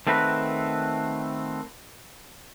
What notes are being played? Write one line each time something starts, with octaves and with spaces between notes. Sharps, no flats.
D#3 A3 C4 F#4 B4